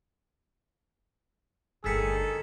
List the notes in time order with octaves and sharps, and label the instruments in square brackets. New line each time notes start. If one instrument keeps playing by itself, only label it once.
[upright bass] G1 A3 [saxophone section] D#3 A4 [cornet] G#4 [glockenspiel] E6 B6 C#7